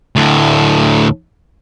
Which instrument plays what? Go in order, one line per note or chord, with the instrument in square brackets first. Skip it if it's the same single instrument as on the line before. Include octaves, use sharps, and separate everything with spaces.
[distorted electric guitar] D2 A2